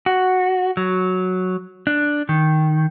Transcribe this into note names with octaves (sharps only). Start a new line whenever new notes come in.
F#4
F#3
D4
D#3